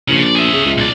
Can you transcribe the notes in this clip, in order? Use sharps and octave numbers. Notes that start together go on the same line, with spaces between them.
A#1 C#3 C#4
D5
G#4 E5
C#3
C#2
B1 D5